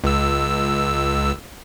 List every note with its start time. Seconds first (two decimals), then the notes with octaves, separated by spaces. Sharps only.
0.04 C#2 E6